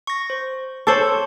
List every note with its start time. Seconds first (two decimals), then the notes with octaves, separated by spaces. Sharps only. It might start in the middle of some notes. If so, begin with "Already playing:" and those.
0.07 C#6 A#6
0.30 C5
0.87 A4 C5 C#5 C#6 D6